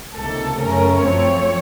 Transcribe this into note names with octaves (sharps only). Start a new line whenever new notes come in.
C#2 C3 D#3 A#3 A4
F#2 C#3 A3 C#4 A#4
F#2 F3 A3 C4 C#5